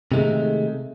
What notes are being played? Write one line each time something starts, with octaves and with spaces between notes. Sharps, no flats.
C3 D#3 G#3 A3